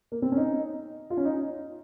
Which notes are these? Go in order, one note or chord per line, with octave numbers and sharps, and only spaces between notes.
A#3
C4
C#4
D#4
F4
C#4
D#4